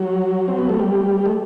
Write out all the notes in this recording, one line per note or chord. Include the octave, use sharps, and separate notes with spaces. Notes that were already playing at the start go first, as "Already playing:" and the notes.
Already playing: F#3
C4
B3
A3
G3
A3